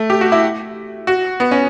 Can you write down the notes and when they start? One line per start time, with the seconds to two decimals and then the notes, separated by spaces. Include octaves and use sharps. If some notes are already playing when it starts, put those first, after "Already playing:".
Already playing: A3
0.10 G4
0.21 F#4
0.32 E4
1.07 F#4
1.40 B3
1.51 C#4